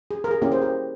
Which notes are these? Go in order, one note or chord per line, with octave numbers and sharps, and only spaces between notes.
G#4
A#4
G#4
A#3 C#4 E4 G4 A#4
G#4 C5
G4 A#4